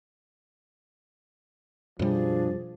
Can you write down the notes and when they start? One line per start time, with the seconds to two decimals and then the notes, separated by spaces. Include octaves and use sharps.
1.99 F#2 B2 F3 G3 D4 G#4